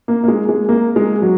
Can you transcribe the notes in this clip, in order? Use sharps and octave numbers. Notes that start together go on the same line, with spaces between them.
A#3
A#3
G#3
G#3
A#3
G#3
F#3